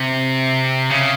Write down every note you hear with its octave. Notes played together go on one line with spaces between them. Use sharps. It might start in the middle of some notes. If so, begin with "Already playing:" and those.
Already playing: C3
C#3